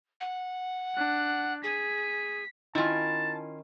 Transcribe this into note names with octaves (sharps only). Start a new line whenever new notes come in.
F#5
D4 F#6
G#4 B6
D#3 C#4 E4 F4 A5